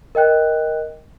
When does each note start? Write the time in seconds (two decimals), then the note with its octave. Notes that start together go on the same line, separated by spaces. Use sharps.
0.15 A#4 D#5 G5 F#6